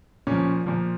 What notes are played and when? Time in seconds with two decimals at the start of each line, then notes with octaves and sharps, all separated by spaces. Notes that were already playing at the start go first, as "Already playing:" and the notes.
0.27 A#2 F3 C#4
0.66 A#2 F3